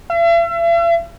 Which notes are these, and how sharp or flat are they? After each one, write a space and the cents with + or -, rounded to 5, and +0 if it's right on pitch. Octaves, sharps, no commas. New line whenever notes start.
E5 +45